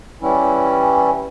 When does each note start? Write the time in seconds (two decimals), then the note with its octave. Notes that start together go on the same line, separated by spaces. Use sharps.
0.22 E3 G3 C#4 E4